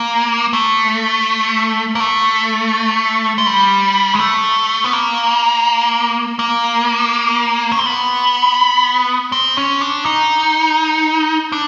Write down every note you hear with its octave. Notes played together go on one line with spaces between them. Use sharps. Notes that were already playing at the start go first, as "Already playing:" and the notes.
Already playing: A#3
A3
A#3
A3
G#3
G3
G#3
A3
B3
A#3
A#3
C#4
C4
B3
C4
C#4
D4
D#4
D4